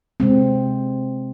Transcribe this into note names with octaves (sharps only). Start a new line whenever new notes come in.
C3 G#3 C4